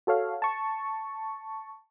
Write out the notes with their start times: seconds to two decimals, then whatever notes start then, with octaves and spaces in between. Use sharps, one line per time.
0.07 F#4 A4 C#5 F5
0.42 A5 C#6